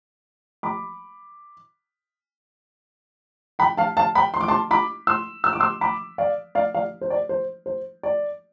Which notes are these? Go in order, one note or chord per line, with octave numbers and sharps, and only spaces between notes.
B5 D6
G5 B5
F5 A5
F5 A5
G5 B5
C6
D6
A5 C6
B5 D6
C6 E6
E6
D6
C6 E6
B5 D6
D5 F5
D5 F5
D5 F5
C5
D5
C5
C5
D5